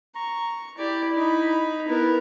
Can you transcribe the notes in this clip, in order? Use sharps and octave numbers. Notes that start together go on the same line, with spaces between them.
A#5 C#6
E4 G4 D5
D#4 B5
B3 E4 A#4